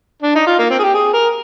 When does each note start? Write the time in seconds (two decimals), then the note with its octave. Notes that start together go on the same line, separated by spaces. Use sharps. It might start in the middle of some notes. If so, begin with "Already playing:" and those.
0.22 D4
0.35 D#4
0.46 F4
0.59 A#3
0.70 C4
0.79 G#4
0.83 G4
0.94 G#4
1.13 A#4